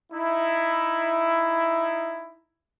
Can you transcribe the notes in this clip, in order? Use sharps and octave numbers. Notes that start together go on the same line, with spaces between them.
D#4 E4